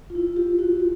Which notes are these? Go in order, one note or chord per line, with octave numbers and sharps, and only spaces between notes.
F4
E4
F4 G4
E4 F#4
E4